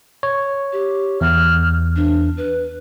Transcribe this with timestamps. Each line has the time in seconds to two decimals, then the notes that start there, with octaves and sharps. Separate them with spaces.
0.23 C#5
0.73 G4
1.21 E2 F6
1.96 D4
2.37 B4